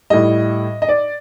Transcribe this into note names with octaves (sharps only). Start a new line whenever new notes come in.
A2 G3 D#5
D#5
D5